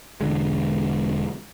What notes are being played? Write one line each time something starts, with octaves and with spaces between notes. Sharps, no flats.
E1 D3 G#3